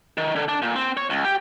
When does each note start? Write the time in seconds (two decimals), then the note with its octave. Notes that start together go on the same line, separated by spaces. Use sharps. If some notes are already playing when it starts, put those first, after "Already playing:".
0.17 D#3
0.36 D3
0.49 D4
0.62 A#2
0.76 C4
0.97 C#5
1.10 C#2
1.25 G4